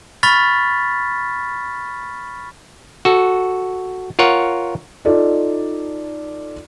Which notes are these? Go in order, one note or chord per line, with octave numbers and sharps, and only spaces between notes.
B5 C#6 F6 A6 B6
F#4 A4
F4 A#4 C#5 F#5
D#4 F4 A4 D5